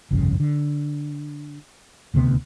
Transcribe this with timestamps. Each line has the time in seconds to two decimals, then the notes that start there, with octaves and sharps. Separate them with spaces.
0.11 G1 C2 F2 C#3
0.40 D3
2.14 D#1 D2 C3 B3